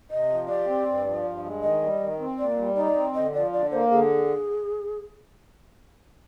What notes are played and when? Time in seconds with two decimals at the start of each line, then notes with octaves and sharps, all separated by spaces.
0.11 C3 D#5
0.30 F3
0.48 G4 D5
0.67 C4
0.87 G2
1.06 F3
1.24 G2
1.44 G#3
1.63 D#3 D#5
1.82 G3
2.00 D#3
2.20 C4
2.39 A#2 D5
2.58 G3
2.76 D#4 D5
2.96 C4
3.14 D3 D#5
3.34 F3 D5
3.53 D3 D5
3.71 A#3 C5
3.91 D3 G#4